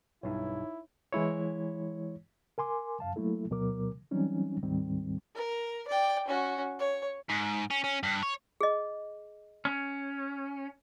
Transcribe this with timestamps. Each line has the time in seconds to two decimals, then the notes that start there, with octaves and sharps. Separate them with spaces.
0.23 B1 G2 D#4 E4 C#5
1.13 E3 G#3 E4 C#5
2.58 A#4 G#5 C6 D6
3.00 F#2 F5 A5
3.16 F#3 A3 A#3 E4 A4
3.50 D2 B2 F#3 B3 A#4 D6
4.11 E3 F#3 G3 C4 C#4 D#4
4.63 D2 G#2 D#3 G3 C4
5.35 A#4
5.88 D5 G5
6.28 C#4 F#4
6.79 C#5
7.30 G#2
7.71 C#4
7.84 C#4
8.03 G2
8.23 C#5
8.61 G#4 D#5
9.65 C#4